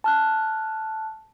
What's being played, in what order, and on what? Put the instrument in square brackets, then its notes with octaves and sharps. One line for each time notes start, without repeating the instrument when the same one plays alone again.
[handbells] A5 F6 F#6